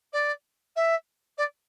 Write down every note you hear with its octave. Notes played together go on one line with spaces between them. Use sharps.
D5
E5
D5